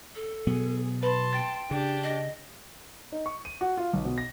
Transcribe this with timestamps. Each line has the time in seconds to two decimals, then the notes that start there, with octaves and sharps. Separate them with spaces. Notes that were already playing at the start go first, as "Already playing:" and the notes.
0.15 A4
0.47 B2 F#3 B3 G#4
1.03 B4 A5 B5 C6
1.33 G5 A6
1.71 C#3 D4 G4
2.03 D#5
3.12 D#4
3.26 C#6
3.45 D#7
3.61 F#4
3.77 F4
3.93 B1
4.05 B2
4.18 A#6